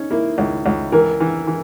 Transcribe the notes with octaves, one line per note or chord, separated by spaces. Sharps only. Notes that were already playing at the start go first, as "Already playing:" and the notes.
Already playing: C#4 D#4
A#3 E4
C#2
C#2
E3 A#4
E3
E3